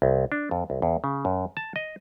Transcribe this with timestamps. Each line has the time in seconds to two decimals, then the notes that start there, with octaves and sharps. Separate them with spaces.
0.02 C2
0.32 D4
0.51 F2
0.70 C2
0.82 E2
1.04 C#3
1.25 F#2
1.57 A5
1.76 D#5